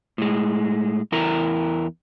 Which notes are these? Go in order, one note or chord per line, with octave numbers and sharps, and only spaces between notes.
A2 G#3
E2 E4 A#4 A#5